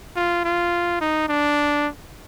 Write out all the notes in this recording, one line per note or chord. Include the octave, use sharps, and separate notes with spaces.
F4
F4
D#4
D4